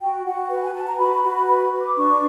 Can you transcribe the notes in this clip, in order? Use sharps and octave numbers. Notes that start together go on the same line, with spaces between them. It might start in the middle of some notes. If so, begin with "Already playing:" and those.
F#4 G5
F#4 F#5
B4 F#5
G#5
B4 A5
A#5
F#4 B5
F#4
B4 B5
B4
D6
D4 C#6